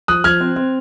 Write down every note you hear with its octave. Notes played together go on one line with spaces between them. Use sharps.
F3 D#6 F#6
F3 F6 G#6
C4
C4